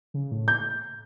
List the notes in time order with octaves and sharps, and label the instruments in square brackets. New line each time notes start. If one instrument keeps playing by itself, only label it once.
[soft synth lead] C#3
A2
[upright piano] G6